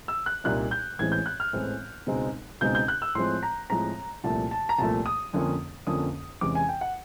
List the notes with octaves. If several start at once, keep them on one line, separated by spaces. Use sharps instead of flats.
E6
F#6
C2 A#2 G3 A#3 D#4 F#6
G6
A1 A2 E3 G#3 C4 G#6
G6
F#6
F6
A1 A2 E3 G#3 C4
C#2 B2 G#3 C4 D#4
C#2 B2 G#3 C4 D#4 G6
G6
F#6
E6
A2 F3 G#3 C4 C6
A#5
A2 F3 G#3 C4 A#5
C2 A#2 F3 A3 A5
A5
A#5
C2 A#2 F3 A3 A5
D#6
F2 D3 F3 A#3 C#4
F2 D3 F3 A#3 C#4 D#6
E2 C3 E3 G#3 C#4 D6
G#5
G5
F#5